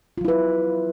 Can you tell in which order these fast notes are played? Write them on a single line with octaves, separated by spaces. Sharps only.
F4 F#3 E4 B4